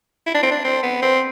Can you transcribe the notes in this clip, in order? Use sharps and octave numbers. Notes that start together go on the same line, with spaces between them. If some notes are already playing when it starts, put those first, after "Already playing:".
E4
D4
C4
D4
C4
B3
C4